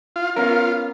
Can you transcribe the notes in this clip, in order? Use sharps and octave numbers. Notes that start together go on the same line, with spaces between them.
F4
B3 C#4 F4 A#4